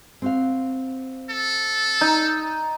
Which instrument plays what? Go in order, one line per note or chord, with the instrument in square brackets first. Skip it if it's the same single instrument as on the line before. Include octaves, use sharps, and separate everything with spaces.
[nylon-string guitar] C4 F#4 F5
[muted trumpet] A4
[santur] D#4